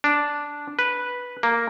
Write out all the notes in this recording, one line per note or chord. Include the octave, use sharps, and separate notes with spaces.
D4
B4
A#3